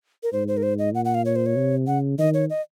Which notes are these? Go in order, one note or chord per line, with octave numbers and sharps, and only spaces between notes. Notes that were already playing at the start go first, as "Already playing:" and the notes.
A#4
G#2 C5
C5
A#4
C5
D#5
A#2 F#5
F#5
F5
C#5
C5
C#5
C3
C#3 F#5
D#3 D#5
C#5
D#5